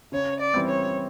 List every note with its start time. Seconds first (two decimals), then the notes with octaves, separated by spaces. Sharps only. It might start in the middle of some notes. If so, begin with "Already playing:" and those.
0.12 C#3 C#5
0.39 D5
0.54 E3 G3 C4
0.68 C#5